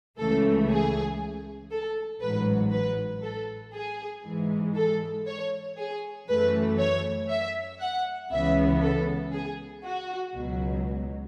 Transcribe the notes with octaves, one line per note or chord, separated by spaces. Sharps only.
C#2 C#3 E3 A3 A4
G#4
A4
A1 G#2 F#3 B4
B4
A4
G#4
G#2 E3 G#3
A4
C#5
G#4
F#2 E3 A3 B4
C#5
E5
F#5
C#2 C#3 E3 B3 E5
A4
G#4
F#4
C#2 B2 F#3